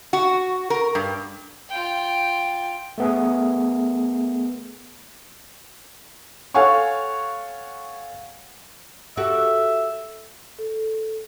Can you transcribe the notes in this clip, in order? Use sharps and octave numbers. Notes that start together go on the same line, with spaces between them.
F#4
A#4
G2
F4 G5
A3 B3 G#4
A4 C#5 F5 F#5 G#5 C#6
F#4 G4 A4 E5
A4